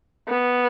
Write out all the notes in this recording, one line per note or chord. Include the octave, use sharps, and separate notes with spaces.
B3